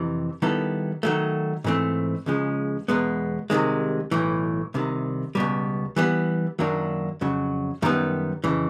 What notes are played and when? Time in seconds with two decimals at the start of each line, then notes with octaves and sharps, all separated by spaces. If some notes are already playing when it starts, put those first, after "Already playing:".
Already playing: F2 C3 E3
0.42 D#3 G3 B3 E4 A4
1.03 D#3 F#3 A3
1.64 G#2 E3 A3 C4
2.26 C#2 C#3 F3 G#3
2.88 E2 B2 G#3 B3
3.50 C2 C3 D#3 G#3
4.11 B1 A2 E3
4.74 C2 C3 D#3
5.35 C#2 B2 G3
5.96 E3 G3 B3
6.59 F#2 D#3 F#3 A#3 D4
7.21 F2 C#3 F#3
7.82 F#2 D#3 G3 B3
8.44 F2 C#3 E3